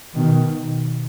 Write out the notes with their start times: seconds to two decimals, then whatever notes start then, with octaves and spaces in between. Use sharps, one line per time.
0.15 B2 D#3